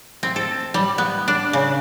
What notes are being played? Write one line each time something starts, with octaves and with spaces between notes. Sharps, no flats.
C4
A4
G3
B3
D4
C#3